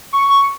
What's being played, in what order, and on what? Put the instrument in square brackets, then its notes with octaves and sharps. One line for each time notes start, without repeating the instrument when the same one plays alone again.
[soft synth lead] C#6